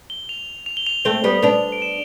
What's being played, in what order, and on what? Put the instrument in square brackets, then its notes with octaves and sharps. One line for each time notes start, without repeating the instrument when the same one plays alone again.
[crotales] G7
F7
F7
G7
F7
[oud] A3 C4 [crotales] G7
[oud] G3 B3
[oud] B3 D4 [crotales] F7
[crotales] D7
E7